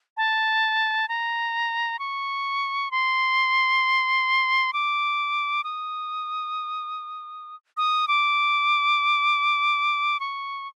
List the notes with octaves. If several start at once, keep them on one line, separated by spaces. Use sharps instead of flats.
A5
A#5
C#6
C6
D6
D#6
D#6
D6
C#6